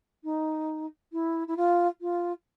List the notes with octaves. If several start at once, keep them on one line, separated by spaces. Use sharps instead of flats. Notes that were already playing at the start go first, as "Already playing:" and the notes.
D#4
E4
E4
F4
F4